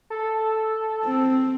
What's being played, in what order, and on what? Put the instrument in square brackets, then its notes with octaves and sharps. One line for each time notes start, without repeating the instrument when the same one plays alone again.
[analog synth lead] A4
[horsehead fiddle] C4